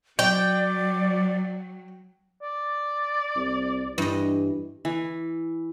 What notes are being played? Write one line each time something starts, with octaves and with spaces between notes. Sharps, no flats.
F#3 D5 G5
D5
C2
G2 E3 D#5
E3